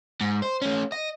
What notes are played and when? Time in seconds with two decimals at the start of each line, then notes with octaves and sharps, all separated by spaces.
0.21 G#2
0.42 C5
0.62 A3 C#4
0.92 D#5